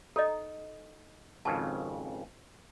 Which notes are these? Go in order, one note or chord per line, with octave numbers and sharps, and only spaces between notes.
D#4 A4 D#5
G#1 F2 C#3 A5